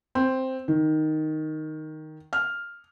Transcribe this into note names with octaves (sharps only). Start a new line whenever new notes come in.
C4
D#3
F6